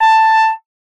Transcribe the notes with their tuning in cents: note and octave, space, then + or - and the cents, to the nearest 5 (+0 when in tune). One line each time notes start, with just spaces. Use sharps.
A5 +10